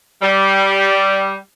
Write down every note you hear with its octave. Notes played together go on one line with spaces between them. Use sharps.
G3